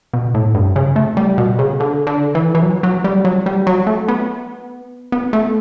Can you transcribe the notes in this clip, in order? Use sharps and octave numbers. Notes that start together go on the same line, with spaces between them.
B2
A2
G2
C#3
A3
G3
B2
C#3
D3
D3
E3
E3
F#3
F#3
G3
F#3
G3
F#3
A3
B3
B3
A3